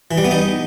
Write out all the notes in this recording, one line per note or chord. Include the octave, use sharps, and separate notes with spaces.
E3
G3
B3
D#4